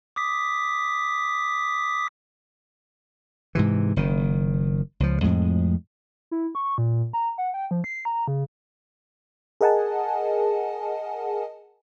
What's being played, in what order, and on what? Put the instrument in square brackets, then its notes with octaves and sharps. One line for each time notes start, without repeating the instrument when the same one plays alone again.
[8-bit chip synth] D6 D#6 B6
[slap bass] G#2 C3 E3
F#1 D#3
C#2 F3
F2 A2 G#3
[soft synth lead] E4
C#6
A#2
A#5
F#5
G5
F3
C7
A#5
C#3
[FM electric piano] G#4 A#4 D#5 F#5 G#5 A5